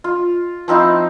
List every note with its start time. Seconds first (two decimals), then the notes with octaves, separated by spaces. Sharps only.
0.04 F4
0.68 F3 C4 D#4 E4